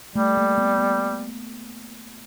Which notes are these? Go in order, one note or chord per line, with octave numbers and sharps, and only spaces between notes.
G3 A3
A#3
B3
B3